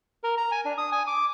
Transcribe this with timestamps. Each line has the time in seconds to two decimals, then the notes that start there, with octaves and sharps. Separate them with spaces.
0.24 A#4
0.37 A#5
0.52 G#5
0.65 D4
0.78 D#6
0.92 G#5
1.07 D6